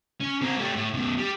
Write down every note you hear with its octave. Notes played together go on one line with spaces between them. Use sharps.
C#4
C4 A#4
A3 G4
A2
F#2 B2
G3